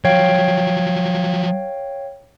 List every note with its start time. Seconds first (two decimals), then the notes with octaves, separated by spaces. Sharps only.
0.05 F3 F#3 C#5 F5 G5